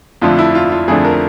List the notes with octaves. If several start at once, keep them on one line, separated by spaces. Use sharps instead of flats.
F2 D3 F3 A3 D4 F4
E4
F4
F4
F2 D3 F3 A3 D4 G#4
A#4